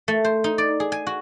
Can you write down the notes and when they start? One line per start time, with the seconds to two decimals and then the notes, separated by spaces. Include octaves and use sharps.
0.08 A3
0.24 C5
0.44 D#4
0.58 D5
0.80 G#4
0.92 G#5
1.07 F#4